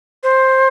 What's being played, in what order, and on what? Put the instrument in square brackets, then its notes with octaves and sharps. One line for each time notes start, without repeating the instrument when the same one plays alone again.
[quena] C5